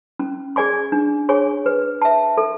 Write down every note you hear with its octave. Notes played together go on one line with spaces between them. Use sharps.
C#4
G#4 D5 G#5 C#6
D4
G#4 C#5 G#5 C#6
B4
E5 A5
A4